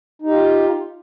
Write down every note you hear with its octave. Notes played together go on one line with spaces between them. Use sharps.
D#4 F4 G4